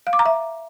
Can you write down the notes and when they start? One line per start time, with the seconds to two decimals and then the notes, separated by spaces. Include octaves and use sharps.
0.07 F5
0.13 D6
0.19 A#5
0.26 E5